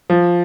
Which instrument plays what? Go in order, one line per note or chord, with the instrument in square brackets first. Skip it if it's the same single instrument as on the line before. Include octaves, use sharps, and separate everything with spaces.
[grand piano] F3